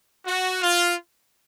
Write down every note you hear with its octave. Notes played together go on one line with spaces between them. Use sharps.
F#4
F4